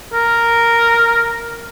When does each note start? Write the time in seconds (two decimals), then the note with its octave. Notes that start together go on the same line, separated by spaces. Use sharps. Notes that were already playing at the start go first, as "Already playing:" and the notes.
0.13 A#4